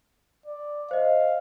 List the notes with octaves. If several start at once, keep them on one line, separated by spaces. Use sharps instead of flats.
D5
C5 D#5 F5